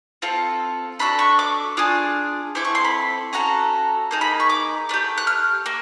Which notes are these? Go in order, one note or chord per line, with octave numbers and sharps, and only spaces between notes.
C4 F4 A4
D4 F#4 A4 B5
C#6
D6
D4 F4 G#4 D#6
C4 E4 A4 D6
C#6
C6
B5
C#4 F#4 A4 A#5
A#3 D#4 G#4
B5
C#6
D6
A3 D4 G4
F#6
F6
A#3